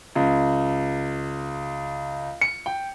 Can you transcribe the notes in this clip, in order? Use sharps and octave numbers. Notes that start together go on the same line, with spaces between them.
C#2
C#7
G5